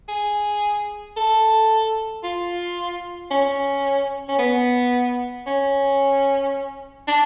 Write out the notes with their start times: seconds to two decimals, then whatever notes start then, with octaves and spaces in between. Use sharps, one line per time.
0.08 G#4
1.16 A4
2.23 F4
3.31 C#4
4.29 C#4
4.39 B3
5.47 C#4
7.08 D4